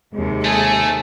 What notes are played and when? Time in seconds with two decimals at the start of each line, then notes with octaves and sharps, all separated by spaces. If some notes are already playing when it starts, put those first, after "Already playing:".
0.14 D#2 C3 G#3
0.44 A3 G#4 A4